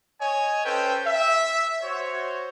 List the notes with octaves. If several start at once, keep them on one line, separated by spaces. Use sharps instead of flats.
C#5 D#5 G#5
C#4 A4 B4 C5 G5
E5
F#4 C5 C#5